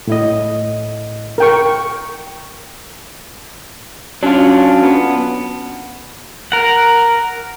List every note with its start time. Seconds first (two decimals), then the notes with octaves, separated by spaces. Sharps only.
0.07 A2 E4 D#5
1.38 A#4 G5 C#6
4.23 F#3 C#4 D4 F4
4.83 B3
6.52 A#4 F#5